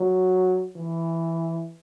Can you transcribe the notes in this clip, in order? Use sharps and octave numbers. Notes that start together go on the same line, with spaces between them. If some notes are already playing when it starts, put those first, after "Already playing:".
Already playing: F#3
E3